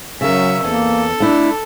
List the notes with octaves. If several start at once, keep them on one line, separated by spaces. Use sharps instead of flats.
C#3 F#3 C#4 A#4 E5
E2 A#3 A4
A3 D4 E4